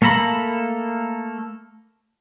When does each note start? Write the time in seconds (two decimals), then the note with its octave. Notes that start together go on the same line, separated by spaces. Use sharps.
0.02 A3 A#3 A4 A#5 B5